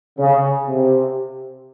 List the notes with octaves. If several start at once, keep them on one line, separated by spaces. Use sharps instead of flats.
C#3
C3